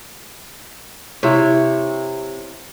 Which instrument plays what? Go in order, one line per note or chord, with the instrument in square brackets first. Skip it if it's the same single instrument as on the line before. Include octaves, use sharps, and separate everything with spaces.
[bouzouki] C3 [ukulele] E4 C#5